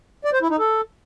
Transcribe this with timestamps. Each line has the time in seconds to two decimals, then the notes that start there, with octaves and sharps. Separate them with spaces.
0.25 D5
0.33 C5
0.42 E4
0.50 D#4
0.59 A4